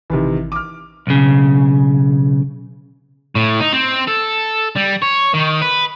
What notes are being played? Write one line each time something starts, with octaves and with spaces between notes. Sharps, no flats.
A1 C3 D#3 E3
D6 F6
B1 C#3
A2
D#4
C4
A4
G3
C#5
D#3
B4